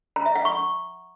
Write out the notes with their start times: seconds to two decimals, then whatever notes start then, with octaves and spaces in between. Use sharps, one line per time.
0.16 A#5
0.26 E5
0.36 F#5
0.45 C#6